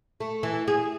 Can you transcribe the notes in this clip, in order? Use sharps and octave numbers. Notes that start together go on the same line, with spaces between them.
A3
E3
G#4